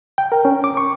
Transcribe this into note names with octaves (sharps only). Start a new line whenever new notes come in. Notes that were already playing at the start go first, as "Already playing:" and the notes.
G5
A#4
C#4
D6
C#6